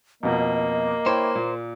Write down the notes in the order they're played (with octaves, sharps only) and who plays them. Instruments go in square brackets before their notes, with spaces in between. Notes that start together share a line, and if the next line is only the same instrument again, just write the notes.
[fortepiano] F2 B2 [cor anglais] A#3 [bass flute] D#5
[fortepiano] E4 C#5 G5 [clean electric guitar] C5
[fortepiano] A#2